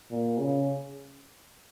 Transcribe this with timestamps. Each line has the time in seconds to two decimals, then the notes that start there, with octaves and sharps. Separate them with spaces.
0.10 A#2
0.38 C#3